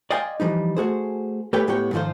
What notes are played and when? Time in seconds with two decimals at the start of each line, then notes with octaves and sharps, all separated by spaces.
0.11 D5 D#5 F5 G5 G#5 C6
0.40 E3 F3 G3 D#4
0.77 A3 F#4 G#4 C5
1.53 A3 G4 B4 C#5 G5
1.67 A2 G#3 B3 G4 C#5 G5
1.93 G#2 D#3 F3 F4 C5